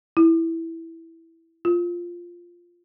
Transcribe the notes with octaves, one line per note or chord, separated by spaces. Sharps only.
E4
F4